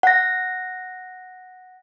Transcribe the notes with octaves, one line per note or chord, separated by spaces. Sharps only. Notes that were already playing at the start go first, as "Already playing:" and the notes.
F#5 A#6